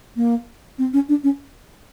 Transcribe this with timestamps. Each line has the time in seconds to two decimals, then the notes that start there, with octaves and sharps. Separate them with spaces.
0.16 A#3
0.78 C4
0.93 C#4
1.09 D4
1.24 C#4